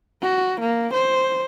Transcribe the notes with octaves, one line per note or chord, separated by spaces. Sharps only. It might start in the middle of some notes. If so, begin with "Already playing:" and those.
F#4
A#3
C5